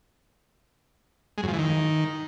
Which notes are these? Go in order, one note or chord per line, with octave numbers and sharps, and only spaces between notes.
G#3
F#2
F3
E3
D#3